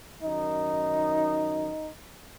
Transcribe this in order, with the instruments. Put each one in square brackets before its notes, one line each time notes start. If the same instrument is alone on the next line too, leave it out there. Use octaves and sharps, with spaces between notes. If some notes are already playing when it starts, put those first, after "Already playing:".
[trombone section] F#2 D#3 D#4